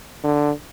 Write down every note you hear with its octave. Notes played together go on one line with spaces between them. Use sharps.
D3